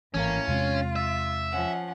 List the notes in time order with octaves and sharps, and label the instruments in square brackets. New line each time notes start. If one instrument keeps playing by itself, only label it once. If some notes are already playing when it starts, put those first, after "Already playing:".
[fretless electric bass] G#1 E3 [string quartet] A2 A#3 [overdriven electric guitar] C#4
[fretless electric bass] E2 C3 G#3 [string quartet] F4
[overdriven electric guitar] E5
[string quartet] F3 C#4 F#5